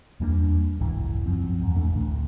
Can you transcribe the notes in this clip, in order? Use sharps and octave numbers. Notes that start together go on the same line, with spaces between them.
E2 G3 A#3 D4
F1 C2 G#2 E3
F#2 F3 C4
E2 G#2
A1 E2 A3 D4
A1 D2